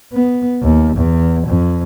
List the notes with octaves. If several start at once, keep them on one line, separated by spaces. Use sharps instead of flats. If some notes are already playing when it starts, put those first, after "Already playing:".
B3
D#2
E2
F2